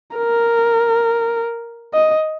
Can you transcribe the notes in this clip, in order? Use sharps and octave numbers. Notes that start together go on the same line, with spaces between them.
A#4
D#5